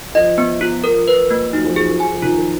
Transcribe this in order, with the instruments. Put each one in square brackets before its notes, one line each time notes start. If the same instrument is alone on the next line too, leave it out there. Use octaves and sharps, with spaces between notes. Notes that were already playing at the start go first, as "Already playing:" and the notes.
[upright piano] F3 [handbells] D#5
[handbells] B3
F4
A#4
B4
A#3
[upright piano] F#3 [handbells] D#4
[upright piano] F3
[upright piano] F#3 [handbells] G#4
[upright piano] F3
[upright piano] F3 [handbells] G#5
[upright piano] F3
[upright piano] D#3 [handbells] F4
[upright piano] F3